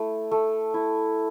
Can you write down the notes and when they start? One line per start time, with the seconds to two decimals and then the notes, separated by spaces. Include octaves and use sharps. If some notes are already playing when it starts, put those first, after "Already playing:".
Already playing: A3 E4
0.31 A3
0.74 E4